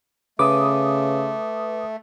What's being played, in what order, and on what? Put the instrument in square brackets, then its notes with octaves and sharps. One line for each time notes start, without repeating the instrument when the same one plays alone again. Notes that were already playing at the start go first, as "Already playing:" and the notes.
[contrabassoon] C#3 [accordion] A3 [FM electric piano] B4 D#6 [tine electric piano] D6